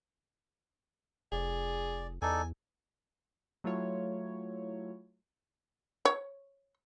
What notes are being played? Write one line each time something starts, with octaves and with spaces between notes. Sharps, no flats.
F1 G#4 D5
E2 D#4 A4 D5 G#5
F#3 A3 E4 F4 C#5
C#5